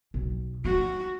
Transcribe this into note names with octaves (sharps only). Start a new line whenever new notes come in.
B1
G3 C#4 F#4